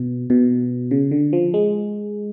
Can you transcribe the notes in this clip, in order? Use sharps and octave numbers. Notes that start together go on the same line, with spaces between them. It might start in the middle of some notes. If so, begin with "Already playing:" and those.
Already playing: B2
B2
C#3
D3
F3
G#3